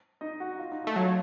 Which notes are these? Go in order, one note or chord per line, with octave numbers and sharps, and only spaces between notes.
D#4 D#5
F#4 F#5
F4 F5
D#4 D#5
A3 D#4 D#5
F#3 F4 F5